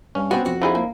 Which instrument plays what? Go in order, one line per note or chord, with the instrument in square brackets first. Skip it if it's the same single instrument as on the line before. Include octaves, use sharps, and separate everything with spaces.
[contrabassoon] G2 [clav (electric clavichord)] C#4
[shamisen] B3 C4 [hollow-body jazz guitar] F#4
[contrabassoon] F2 [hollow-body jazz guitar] F#4
[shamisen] D3 D#4 G#4 [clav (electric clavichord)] F3 E4
[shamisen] A#3